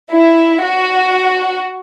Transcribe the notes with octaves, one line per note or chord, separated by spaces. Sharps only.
E4
F#4